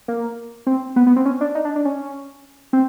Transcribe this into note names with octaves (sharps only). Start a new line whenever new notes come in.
A#3
C4
B3
B3
C4
C#4
D4
D#4
D4
D4
C#4
C4